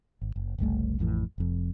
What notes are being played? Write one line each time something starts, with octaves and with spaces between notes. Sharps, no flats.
G#1
F#1
F#1 C2 G3 A3
A1 F2 A2 E3
F1 F2